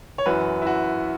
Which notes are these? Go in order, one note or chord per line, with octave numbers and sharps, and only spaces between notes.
C#5
F#2 E3 F#4 B4
E4
F#4